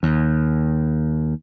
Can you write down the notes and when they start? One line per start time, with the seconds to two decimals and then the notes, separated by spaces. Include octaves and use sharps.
0.03 D#2